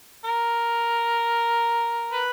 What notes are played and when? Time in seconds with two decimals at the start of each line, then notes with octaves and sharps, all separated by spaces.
0.25 A#4
2.13 B4